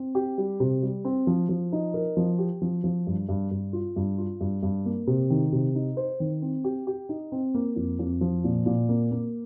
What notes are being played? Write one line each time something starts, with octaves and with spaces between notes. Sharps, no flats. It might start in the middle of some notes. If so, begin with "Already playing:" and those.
Already playing: C4
G4
G3
C3
G3
C4
F3
F3
D#4
A#4
F3
G4
F3
F3
G2
G2
G2
F4
G2
F4
G2
G2
A#3
C3
D#3
C3
D#4
C5
D#3
C4
G4
G4
D#4
C4
A#3
F2
F2
F3
A#2
A#2
A#3
A#3